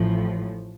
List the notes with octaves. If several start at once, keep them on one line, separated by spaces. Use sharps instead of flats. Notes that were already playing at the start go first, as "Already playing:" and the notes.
Already playing: A1 A2 F3